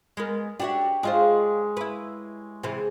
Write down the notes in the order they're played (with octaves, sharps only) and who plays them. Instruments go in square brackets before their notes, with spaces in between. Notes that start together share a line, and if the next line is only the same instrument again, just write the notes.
[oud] G#3 B3 A#4
[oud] D4 F#4 E5 [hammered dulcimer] G4 C#5
[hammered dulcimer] G#3 [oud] D4 F4 C5
[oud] E4 B4
[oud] C3 E3 [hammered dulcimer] G#4 C5